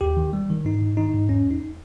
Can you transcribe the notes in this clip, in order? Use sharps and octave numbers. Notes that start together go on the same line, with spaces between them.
D#2 G4
D#3
G3
D#3
G#2 D#4
G#2
D#3 D#4
G#2
E2 C#4
E2
D#4